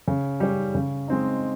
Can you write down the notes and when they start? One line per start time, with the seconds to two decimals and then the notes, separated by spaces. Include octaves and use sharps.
0.08 C#3
0.40 G3 C#4
0.75 C#3
1.08 G#3 C4 D#4